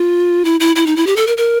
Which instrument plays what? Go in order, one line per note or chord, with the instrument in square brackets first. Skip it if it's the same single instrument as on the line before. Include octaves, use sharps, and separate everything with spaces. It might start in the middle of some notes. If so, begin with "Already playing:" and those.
Already playing: [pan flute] F4
E4
E4
E4
D#4
E4
G4
A4
A#4
A#4